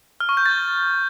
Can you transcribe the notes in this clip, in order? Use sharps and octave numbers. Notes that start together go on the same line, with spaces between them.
F6
C#6
G6
A6